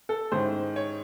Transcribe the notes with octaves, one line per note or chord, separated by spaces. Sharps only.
A4
G#2 D#3 G#3 C#4 E4 C5
C#5